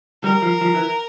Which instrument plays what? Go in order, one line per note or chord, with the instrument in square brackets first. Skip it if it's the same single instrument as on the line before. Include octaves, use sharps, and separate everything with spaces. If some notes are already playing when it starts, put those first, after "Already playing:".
[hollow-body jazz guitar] G3 [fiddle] A#4
[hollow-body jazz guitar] F3
F3
E3